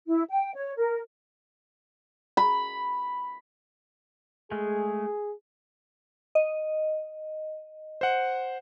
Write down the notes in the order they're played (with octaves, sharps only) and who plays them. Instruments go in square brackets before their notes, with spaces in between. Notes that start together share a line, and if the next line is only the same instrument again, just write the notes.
[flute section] E4
G5
C#5
A#4
[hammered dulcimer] B5
[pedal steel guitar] G#3 A3 [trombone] G#4
[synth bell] D#5
[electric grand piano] C5 F#5